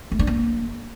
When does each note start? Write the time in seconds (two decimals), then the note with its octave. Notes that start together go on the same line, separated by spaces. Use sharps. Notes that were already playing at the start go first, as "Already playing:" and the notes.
0.12 A3
0.19 D4
0.27 A#3